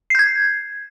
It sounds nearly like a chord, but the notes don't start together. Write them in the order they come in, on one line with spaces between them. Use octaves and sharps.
C7 G6 G#6